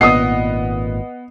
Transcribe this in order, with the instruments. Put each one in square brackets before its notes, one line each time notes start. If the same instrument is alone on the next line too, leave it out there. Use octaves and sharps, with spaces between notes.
[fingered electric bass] G#1 A#2 [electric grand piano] B3 D#5 F#5 [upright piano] D#6 C7